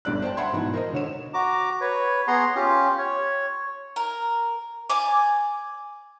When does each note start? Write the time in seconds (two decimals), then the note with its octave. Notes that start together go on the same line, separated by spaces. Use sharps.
0.05 G1 G2 D5 F#6
0.22 C5 D5 G5 A5
0.37 E5 F#5 B5 C6 G#6
0.52 G#2 B2 E3 D#4
0.73 A#4 C5 D#5
0.93 D3 C#5 E7
1.34 F#4 A#5 D6
1.81 B4 C#5
2.28 B3 G#4 F#5 A#5 C6
2.56 C#4 F4 G4
2.98 C#5
3.96 A#4
4.90 D5 G#5 D6